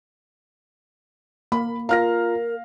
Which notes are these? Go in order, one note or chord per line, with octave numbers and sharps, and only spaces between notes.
A#3 B5
F4 A#4 F5 A#5 F6 A#6